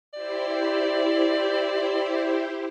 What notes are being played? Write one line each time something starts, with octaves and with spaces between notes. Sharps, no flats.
E4 G4 C5 D5